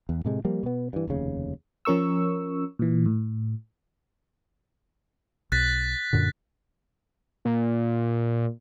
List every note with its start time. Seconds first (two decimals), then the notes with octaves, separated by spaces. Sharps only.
0.09 E2
0.25 A2 C3 G#3 A3
0.45 F3 G3 A#3
0.63 B2 B3
0.93 G2 E3
1.07 F1 D#2 C#3
1.85 F3 C#4 A#4 C#6 E6
2.79 A#2 E3
3.06 A2
5.52 B1 F#6 A6 B6
6.13 F#2 A#2 D3
7.45 A#2